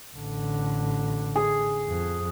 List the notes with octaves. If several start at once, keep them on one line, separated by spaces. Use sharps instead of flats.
A1 D3
G#4
F2